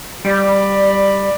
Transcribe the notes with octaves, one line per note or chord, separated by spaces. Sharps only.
G3 D5 B5